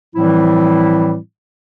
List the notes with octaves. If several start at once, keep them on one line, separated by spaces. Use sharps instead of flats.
A2 E3 F3 G3 C4 E4